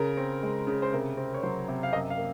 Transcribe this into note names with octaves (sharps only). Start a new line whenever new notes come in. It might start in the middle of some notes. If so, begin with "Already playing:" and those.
Already playing: C#3 A#4
C4
G#3
C#3
C5
C3 A#4
C4
C#5
F#3 C5
C3
F5
F#2 D#5
F5
A#3